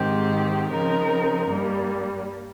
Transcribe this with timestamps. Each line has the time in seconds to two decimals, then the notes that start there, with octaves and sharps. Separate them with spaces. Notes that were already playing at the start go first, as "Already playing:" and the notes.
Already playing: G#2 D#3 G#3 C4 G4
0.70 C#3 F3 C4 D#4 A#4
1.47 G2 G3 A#3